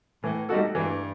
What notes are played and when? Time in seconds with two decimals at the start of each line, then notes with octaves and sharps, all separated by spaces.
0.23 A2 E3
0.49 G3 D#4 F#4 A4
0.75 G2 E3